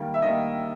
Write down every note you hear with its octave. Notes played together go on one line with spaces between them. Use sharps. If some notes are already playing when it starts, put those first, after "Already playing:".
Already playing: D#3 G3 A#3
E5
D#3 G3 A#3 D#5